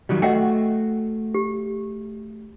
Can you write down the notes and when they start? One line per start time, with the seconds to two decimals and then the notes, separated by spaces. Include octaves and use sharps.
0.09 D#3 F#3 G3
0.22 A3 F#4 D#5 F#5 G5
1.35 G4